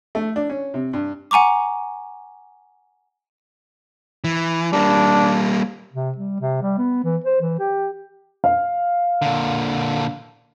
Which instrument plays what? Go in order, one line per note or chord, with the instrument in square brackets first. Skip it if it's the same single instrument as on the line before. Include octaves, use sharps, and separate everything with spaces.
[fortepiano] A3
D4
C#4
C3
G2
[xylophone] F#5 G#5 A#5 C#6 D6
[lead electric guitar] E3
[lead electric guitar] G3 A#3 [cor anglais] D4
[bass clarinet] C3
G3
C3
G3
B3
E3
C5
E3
G4
[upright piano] F5
[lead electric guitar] A#2 D3